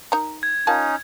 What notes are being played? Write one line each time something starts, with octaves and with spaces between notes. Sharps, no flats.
D#4 A#4 A#5
G#6
C#4 D#4 F4 A#4 A5